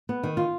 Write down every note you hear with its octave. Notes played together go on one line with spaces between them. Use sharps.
B3
D#3
F4